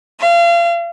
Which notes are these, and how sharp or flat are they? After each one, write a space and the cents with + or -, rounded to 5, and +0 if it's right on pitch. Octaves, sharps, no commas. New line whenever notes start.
F5 -35